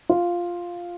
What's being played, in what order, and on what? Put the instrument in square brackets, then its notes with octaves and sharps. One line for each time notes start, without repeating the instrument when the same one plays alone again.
[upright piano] F4